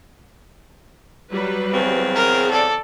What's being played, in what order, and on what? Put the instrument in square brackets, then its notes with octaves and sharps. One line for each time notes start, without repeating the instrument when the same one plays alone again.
[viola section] F#3 G3 B4
[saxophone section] E2 C#3 C4
[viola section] G#4 [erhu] A#4
[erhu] A4 [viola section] D5